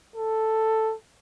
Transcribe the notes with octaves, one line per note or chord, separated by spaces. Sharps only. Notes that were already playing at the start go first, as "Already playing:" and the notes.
A4